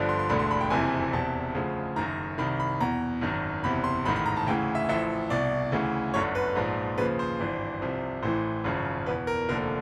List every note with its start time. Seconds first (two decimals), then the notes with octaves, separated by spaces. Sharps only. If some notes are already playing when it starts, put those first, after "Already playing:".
Already playing: G1 G2 D3 F3
0.09 C6
0.19 C6
0.29 E1 D2 D3 B5
0.39 C6
0.51 B5
0.61 G5
0.70 F#1 F2 C3 E3 G#5
1.13 E1 E2 C3 A5
1.55 D2 C#3 F3
1.96 F#1 F#2 D#3 A#5
2.38 C2 C3 D#3 B5
2.60 B5
2.80 E2 B2 A#5
3.21 G#1 F#2 D#3
3.64 F#1 E2 C3 B5
3.84 C6
4.05 A1 G#2 D#3 B5
4.16 B5
4.26 A#5
4.37 A5
4.46 D2 C#3 E3 G5
4.75 E5
4.89 A1 A2 F3 E5
5.30 C2 B2 D5
5.72 D2 C#3 E3
6.14 G1 F#2 D3 C#5
6.35 B4
6.56 A#1 G#2 F3
6.98 D#2 C#3 F3 B4
7.19 C5
7.39 G#1 G2 E3
7.82 C2 C3 F3
8.23 A1 A2 E3 C5
8.64 G#1 F#2 C#3 F3
9.06 E2 B2 B4
9.27 A#4
9.49 F1 D#2 D3 F3 A#4